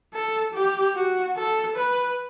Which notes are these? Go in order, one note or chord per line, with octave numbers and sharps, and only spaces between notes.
A4
G4
F#4
A4
B4